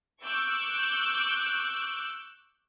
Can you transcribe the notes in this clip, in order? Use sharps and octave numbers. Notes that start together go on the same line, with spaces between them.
C#6 D6 E6 F#6 G6